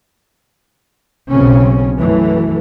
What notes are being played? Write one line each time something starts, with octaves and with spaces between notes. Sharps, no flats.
B1 C#3 C4 C#4
F#2 E3 A3